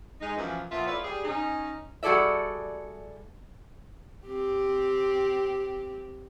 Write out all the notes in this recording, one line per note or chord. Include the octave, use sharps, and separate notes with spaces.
G#3 D#4
F#2 E3 F3
A#2 F3 B3 F4 E5
E4 F4 A4 B4 C#5 D5
G3 G#4
C#4 D#4
G3 F#4 G#4 A4 D5 E5
C4 G4